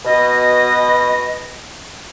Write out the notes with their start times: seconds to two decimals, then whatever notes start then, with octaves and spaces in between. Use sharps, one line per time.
0.05 B2 D#5